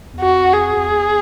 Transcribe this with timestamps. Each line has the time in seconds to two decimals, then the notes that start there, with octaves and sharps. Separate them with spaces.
0.14 E2
0.21 F2 F#4
0.54 G#4
0.77 F2
0.87 E2